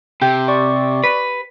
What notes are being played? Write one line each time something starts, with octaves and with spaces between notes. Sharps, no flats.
C3 G4
D5 C#6 D6
B4